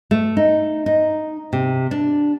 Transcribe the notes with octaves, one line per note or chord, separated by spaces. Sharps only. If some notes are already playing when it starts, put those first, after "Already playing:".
A3
D#4
D#4
C3
D4